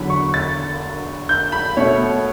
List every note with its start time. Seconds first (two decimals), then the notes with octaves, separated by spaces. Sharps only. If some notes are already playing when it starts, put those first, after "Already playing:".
Already playing: E2 D3 F#3 B5
0.10 C#6
0.34 A6
1.29 G6
1.52 B5
1.77 B2 A3 C#5